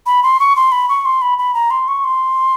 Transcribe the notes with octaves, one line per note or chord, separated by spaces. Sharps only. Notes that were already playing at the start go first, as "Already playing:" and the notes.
B5
C6
C#6
C6
B5
C#6
C6
B5
B5
A#5
C6
C#6
C6